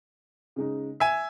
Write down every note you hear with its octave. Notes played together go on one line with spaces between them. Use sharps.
C#3 G#3 D#4
E5 G#5